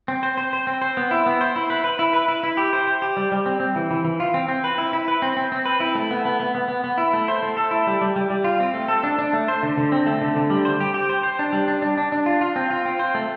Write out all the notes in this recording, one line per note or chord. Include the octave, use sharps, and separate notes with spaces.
C4
C5
C5
C5
C4
C5
B3
E4
B3
C5
E4
B4
B4
E4
B4
E4
E4
G4
C5
C5
G4
G3
G3
C4
C4
E3
E3
E3
F4
C4
C4
B4
E4
E4
B4
C4
C4
C4
B4
E4
A3
B3
B3
B3
B3
B3
B3
E4
A3
C5
A3
A4
E4
G3
G3
G3
G3
F4
C4
A3
A4
D4
D4
A3
C5
D3
D3
C4
A3
D3
D3
G3
C5
G4
G4
C5
C5
D4
G3
D4
D4
D4
D4
F4
F4
C4
F4
C4
C5
A3